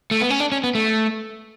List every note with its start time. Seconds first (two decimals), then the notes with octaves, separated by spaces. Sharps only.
0.11 A3
0.20 B3
0.30 C#4
0.40 D4
0.52 C#4
0.64 B3
0.75 A3